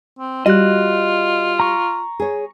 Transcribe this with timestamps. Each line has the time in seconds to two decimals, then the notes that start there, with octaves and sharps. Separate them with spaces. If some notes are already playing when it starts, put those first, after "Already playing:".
0.19 C4
0.46 G3 F4 F#4 D#5 F#6
1.60 A#5 C#6
2.20 G#4 C#5